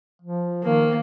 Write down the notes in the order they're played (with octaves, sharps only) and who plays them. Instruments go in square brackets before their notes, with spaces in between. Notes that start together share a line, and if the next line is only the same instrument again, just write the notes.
[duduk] F3
[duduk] D#3 [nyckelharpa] A#3